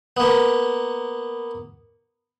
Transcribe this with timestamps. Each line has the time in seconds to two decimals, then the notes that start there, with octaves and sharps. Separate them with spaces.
0.17 A#3 B3